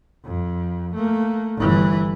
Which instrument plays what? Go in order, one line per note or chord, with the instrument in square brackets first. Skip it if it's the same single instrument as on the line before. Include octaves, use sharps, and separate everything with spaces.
[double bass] F2
A3 A#3
G1 E3